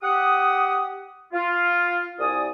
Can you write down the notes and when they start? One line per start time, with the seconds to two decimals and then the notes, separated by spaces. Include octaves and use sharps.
0.02 G4 F#5 D#6
1.33 F4
2.19 C2 D5 G#5 D#6